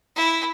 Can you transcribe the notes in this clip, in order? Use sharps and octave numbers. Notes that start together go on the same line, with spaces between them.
E4